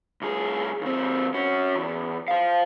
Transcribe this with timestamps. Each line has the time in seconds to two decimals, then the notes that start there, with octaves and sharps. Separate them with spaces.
0.22 C2 G#4
0.81 D#2 C4
1.34 C#4 F#4
1.76 E2
2.28 C5 F5